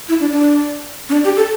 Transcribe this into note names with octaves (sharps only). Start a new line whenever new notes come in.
E4
D4
D4
C#4
D4
G4
A4